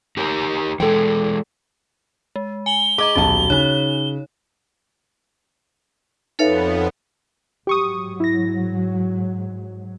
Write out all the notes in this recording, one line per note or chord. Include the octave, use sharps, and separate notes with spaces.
D#4 G4 A#4
E3 G#3 A4 G5
G#3
G#5 F#7 G7
G#4 D#5 A#5 D6
D#1 B1 F#4 A5
C#3 D#4 C#5
F2 B3 D#4 A4 B4 C#5 E5 F5
G#2 F#3 G4 C#6 D#6
E4 A#6